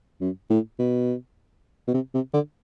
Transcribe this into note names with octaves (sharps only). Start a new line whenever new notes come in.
F#2
A2
B2
B2
C3
C3
D3